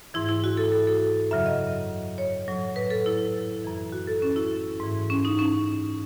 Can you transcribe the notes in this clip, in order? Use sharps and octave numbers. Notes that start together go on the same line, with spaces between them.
G#2 E3 E4
E4
F#4
A4
A4
A4
F#2 C#3 F#3 E5
D#5
C#5
A2 F#3
B4
A4
E4
F#2 E3
F#4
A4
C#4
E4
G#2 E3
C#4
D#4
C#4